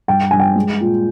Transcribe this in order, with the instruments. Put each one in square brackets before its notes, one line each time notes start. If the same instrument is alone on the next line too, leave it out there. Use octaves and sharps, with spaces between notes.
[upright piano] G2 G5
G2 G#5
G5
G#3
A#2